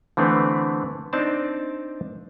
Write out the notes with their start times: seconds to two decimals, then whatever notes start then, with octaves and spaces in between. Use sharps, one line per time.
0.17 D3 E3 A3 B3 C4
1.13 C4 D4 D#4 D5 D#5 A5